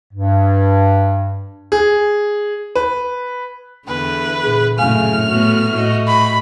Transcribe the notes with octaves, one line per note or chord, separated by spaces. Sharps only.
G2
G#4
B4
E2 D3 B4
A#2 G#4
F#2 A2 C#3 F5 G#5 F6
A2 B3 F#4
A2 A3 F#4 D#5
B5